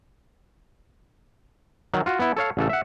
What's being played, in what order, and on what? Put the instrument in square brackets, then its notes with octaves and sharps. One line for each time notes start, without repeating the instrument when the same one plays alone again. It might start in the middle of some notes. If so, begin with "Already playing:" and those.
[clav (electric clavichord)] D#3 F#3
F4 F#4
B3 E4
A4 C#5 F5
A1 C#3 A4
E5 F#5